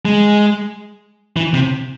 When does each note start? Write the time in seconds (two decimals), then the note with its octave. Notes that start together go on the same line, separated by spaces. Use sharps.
0.05 G#3
1.37 E3
1.54 C3